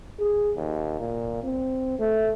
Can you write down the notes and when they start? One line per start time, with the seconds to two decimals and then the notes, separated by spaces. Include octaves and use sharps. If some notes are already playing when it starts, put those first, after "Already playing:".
0.19 G#4
0.55 D#2
1.00 A#2
1.43 C4
1.99 A3